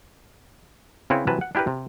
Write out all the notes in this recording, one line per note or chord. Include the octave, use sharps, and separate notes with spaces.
C#3 C4 E4 B4 C#5
C3 E3 F#3 B4 A5
F#5
D4 E4 G4 A#4 B4
C3